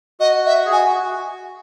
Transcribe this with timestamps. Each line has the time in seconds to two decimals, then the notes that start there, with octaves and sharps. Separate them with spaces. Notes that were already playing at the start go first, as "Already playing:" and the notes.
0.20 F#4 D#5
0.46 E5
0.66 G#4
0.71 F#4 G#5